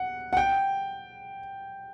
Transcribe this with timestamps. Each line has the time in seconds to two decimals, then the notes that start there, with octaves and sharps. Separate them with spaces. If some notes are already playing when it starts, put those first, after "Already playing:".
Already playing: F#5
0.33 F#5
0.37 G5